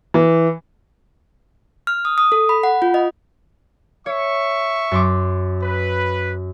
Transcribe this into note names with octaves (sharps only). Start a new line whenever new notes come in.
E3
F6
D#6
D#6
A4
B5
F#5
F4
D#5
C#5 E5 C#6
F#2 C6 D6
B4